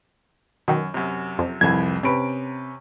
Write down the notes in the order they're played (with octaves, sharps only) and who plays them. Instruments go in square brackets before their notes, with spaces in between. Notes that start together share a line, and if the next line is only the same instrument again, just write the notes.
[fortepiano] F#2 [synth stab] B2 D#3
[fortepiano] F#2 C3
[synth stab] F2
[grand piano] C2 F2 [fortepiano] E3 [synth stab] G#6
[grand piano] C3 D7 [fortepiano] C#4 B4